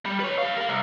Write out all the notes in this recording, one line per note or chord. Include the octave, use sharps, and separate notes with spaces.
G3
B4 C#5
G4 F5
A#4 F5
C2